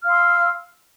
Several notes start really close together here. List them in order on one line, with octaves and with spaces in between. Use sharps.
F6 F5 C6 E6